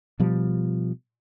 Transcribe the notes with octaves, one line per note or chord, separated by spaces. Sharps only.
B2 F3 G3